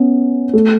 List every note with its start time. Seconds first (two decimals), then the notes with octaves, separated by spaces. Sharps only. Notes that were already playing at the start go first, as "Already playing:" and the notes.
Already playing: B3 C#4
0.53 A3